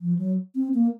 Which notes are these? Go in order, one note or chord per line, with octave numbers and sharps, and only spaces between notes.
F3
F#3
C4
A#3